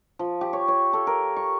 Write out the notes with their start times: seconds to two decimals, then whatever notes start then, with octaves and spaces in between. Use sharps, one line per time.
0.19 F3
0.41 G4
0.53 C#5
0.68 C#5
0.93 A4
1.07 A#4
1.36 C#6